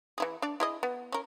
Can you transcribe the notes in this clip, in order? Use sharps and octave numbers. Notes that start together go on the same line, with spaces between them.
E3 E4 G#4
D4 D5
E4 G#4 D#5
B3
C#4 A#4